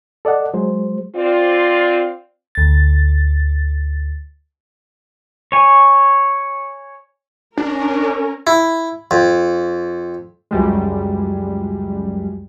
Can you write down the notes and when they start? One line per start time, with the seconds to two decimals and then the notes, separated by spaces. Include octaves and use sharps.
0.25 A4 D5 D#5 F#5
0.54 F#3 G#3 C5
1.16 C4 F4 D5
2.55 D2 A6
5.52 C#5 G#5
7.58 C#4 D4 A#4
8.47 E4
9.11 F2
10.51 C#2 F#2 G3 G#3